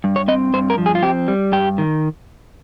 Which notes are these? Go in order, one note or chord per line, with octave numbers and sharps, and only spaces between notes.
G2
C#5
C4 D#5
G2 C5
A#4
F3
G#4
F4
C4 G4
G3
G2 G4
D#3